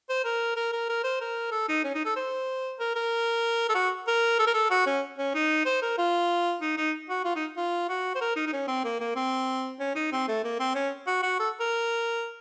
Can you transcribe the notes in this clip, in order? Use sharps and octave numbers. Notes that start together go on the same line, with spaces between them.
C5
A#4
A#4
A#4
A#4
C5
A#4
A4
D#4
C#4
D#4
A4
C5
A#4
A#4
A4
F#4
A#4
A4
A#4
A4
F#4
C#4
C#4
D#4
C5
A#4
F4
D#4
D#4
F#4
F4
D#4
F4
F#4
C5
A#4
D#4
D#4
C#4
C4
A#3
A#3
C4
C#4
D#4
C4
A3
A#3
C4
C#4
F#4
F#4
A4
A#4